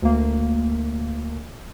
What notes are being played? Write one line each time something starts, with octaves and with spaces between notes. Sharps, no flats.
D2 A#3